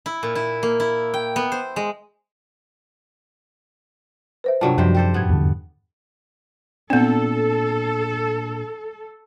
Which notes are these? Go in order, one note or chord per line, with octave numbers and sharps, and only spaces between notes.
E4
A#2
E4
A#3
E4
G5
B3
C5
G#3
B4 C5 E5
G2 C3 F#3 G3 F4 A5
F#2 C3 F3 G3 C5
G4 A4 C5
F2 G#2 B3 G#6
E2 G2 D3
A#2 B3 C4 D4 A4